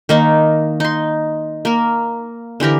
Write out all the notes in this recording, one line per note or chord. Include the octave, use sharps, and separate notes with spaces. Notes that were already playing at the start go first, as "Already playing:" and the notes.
D#3 A#3 D#4
D#4 C6
A#3 A#4
D3 E3 G4 A#4